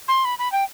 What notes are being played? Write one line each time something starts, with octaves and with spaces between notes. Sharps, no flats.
C6
B5
B5
G5